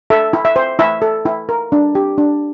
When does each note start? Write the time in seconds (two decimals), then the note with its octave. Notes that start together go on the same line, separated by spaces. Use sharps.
0.10 A4 E5
0.33 E4
0.45 E5
0.56 C5
0.79 E4 E5
1.02 A4
1.26 E4
1.49 A#4
1.72 D4
1.95 G4
2.18 D4